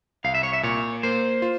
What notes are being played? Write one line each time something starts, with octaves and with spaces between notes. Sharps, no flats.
C2 F5
E5
C#5
E5
A#2 C#5
A#3 C5
F4